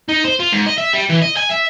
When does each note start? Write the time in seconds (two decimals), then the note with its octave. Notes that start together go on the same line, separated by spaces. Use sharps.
0.09 D#4
0.24 C5
0.40 F4
0.53 G#2
0.66 D#5
0.78 E5
0.93 G3
1.09 E3
1.22 D#5
1.37 G#5
1.50 E5